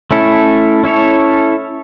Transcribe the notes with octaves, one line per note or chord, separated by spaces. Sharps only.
A3 C#4 E4 A4
C#4 E4 A4 C#5